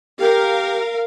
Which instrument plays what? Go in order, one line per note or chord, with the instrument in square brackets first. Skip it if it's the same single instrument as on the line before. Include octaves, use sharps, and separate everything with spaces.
[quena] G4 [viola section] A#4 F5